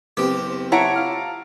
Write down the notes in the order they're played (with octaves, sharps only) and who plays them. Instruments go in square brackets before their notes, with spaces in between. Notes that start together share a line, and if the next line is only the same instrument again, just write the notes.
[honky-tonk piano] F#1 B3 C4 [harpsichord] G4
[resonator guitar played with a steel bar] E4 C#5 F#5 [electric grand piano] A5 A#5 D7
[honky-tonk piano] F4 F6